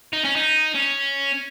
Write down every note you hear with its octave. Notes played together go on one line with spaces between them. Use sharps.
D#4
C#4
D#4
C#4